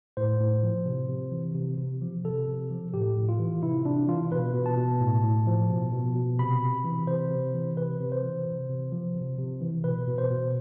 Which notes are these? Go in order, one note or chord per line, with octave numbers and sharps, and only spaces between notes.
A2 C5
A2
F3
C3
C3
E3
C3
C3
F3
C3 A4
C3
F3
A2 G4
A2
F4
E3
C3 E4
C3 D4
E3 F4
B2 B4
B2
A5
B2
A2
A2
F3
B2
B2
B2
C3 B5
C3
E3
C3 C5
C3
E3
C3 B4
C3
C5
E3
C3
C3
F3
C3
C3
E3
B2 B4
B2
C5
B2